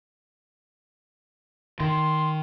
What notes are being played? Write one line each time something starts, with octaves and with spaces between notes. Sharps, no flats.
D#3 C6